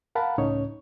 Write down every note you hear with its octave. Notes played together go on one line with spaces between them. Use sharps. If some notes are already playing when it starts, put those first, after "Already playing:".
A#4 F5 F#5 A5 B5
C#2 A2 C#4 D#4 C#5